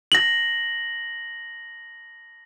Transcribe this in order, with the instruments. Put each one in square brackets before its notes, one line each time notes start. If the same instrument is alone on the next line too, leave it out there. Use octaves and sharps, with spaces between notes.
[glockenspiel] A#6 F#7